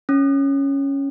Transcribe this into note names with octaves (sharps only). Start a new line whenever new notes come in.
C#4